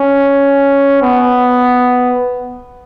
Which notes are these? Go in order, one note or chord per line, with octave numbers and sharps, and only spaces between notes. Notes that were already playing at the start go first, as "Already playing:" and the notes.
Already playing: C#4
B3